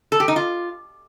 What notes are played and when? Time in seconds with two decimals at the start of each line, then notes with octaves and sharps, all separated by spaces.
0.12 A4
0.20 G4
0.28 D#4
0.36 F4